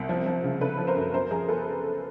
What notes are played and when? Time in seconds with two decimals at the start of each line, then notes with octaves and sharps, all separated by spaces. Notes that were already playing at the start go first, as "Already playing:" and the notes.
Already playing: C2
0.09 F3
0.26 F3
0.44 C#3
0.61 C#3 A4 B4
0.78 F3
0.87 A#4 C5
0.96 F#2
1.13 F#2 A#4 C5
1.31 F3 G#4 A#4
1.49 A4 B4